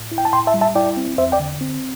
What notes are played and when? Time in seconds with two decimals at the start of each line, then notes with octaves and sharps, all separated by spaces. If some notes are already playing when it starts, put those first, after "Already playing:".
Already playing: A2
0.11 E4
0.18 G5
0.25 A5
0.33 A2 G5 C6
0.47 E5 A5
0.54 G3
0.61 E5 A5
0.75 E4 D5 G5
0.97 C4
1.18 E2 C5 E5
1.32 D5 G5
1.40 D3
1.61 C4